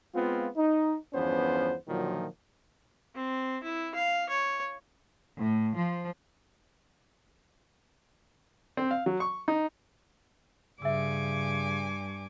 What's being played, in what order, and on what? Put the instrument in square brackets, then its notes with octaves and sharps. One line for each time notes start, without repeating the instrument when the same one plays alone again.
[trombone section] G#3 B3 C4 F4
D#4
E2 G2 F3 B3 C#4 C5
A#2 D3 D#3 F3 F#3
[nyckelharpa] C4
E4
F5
C#5
[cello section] A2
F3
[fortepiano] C4
F5
F#3
C#6
D#4
[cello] G2 [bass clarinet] C#3 [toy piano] E5 E6 [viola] G#5 D6